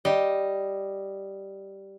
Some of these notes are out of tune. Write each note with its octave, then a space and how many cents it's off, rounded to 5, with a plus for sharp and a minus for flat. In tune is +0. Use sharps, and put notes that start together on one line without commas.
G3 -5 D#5 +0